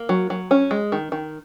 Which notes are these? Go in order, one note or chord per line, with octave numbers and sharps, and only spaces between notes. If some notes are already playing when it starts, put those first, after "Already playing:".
Already playing: A#3
F#3
F#3
C#4
G#3
D#3
D#3